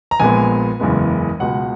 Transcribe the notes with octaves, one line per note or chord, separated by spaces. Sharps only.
A#5
A#1 A#2 G#3 B3 G#5
F#1 E2 C#3 G#3 B3
C#2 B2 G#3 B3 F#5